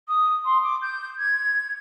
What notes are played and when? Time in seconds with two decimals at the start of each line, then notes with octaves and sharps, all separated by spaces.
0.08 D#6
0.45 C6
0.63 D6
0.82 G6
1.18 G#6